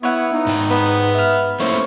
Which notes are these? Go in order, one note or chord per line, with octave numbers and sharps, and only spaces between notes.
B3 E4 C#5 F#5
D#4
G#2 G5
B3
E5 F6
A3 A#3 C#4 E4 C5 C#5